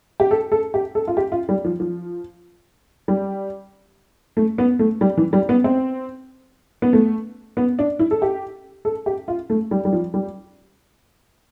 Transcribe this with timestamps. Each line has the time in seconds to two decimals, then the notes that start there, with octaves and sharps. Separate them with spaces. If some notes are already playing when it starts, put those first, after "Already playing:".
0.20 G4
0.31 A4
0.52 A4
0.74 G4
0.95 A4
1.07 F4
1.17 G4
1.32 F4
1.49 G3
1.65 F3
1.80 F3
3.08 G3
4.37 A3
4.58 B3
4.79 A3
5.01 G3
5.17 E3
5.33 G3
5.49 B3
5.64 C4
6.82 B3
6.93 A3
7.57 B3
7.79 D4
7.99 E4
8.11 A4
8.22 G4
8.85 A4
9.06 G4
9.28 F4
9.50 A3
9.71 G3
9.85 G3
9.93 F3
10.14 G3